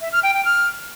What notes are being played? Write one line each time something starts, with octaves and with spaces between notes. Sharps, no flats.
E5
F6
G5
G5
F6